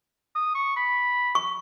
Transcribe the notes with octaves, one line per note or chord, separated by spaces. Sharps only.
D#6
C#6
B5
C#6